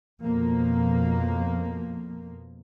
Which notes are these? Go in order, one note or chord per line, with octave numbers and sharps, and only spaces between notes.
F2 B2 F3 A#3